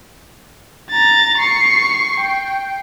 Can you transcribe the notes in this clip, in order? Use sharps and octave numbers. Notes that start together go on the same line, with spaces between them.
A#5 A6
C#6 C7
G5